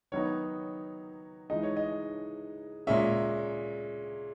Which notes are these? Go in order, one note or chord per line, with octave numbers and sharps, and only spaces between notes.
D#3 F#3 B3 D#4 C#5
E3 G#3 D#4 D#5
C#5
D#5
A#2 G#3 C#4 E5